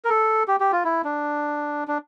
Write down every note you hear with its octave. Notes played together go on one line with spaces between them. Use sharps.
A#4
A4
G4
G4
F4
E4
D4
D4